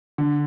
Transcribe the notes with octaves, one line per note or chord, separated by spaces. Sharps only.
D3